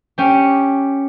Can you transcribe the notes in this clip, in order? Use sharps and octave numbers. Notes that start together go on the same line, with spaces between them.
C#4 G4